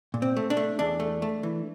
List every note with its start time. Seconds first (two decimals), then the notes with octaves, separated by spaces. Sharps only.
0.14 A#2
0.22 C4
0.36 A3
0.50 D4
0.57 A3
0.79 E2 D4
1.00 A3
1.22 A3
1.43 E3